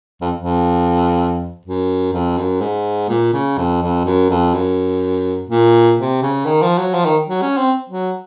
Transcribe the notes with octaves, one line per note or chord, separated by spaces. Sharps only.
F2
F2
F#2
F2
F#2
G#2
A#2
C#3
F2
F2
F#2
F2
F#2
A#2
C3
C#3
D#3
F3
F#3
F3
D#3
F#3
C#4
C4
F#3